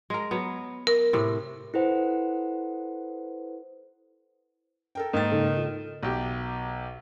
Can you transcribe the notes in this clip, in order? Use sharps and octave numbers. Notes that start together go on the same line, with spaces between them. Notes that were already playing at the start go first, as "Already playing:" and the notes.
G#3 A#4
F#3 B3
A#4
A2 C3
E4 A4 B4 C5 F#5
A4 A#4 G5
G#2 D#3 A#3 A6
C#3 D#4 A4
F3
B1 G4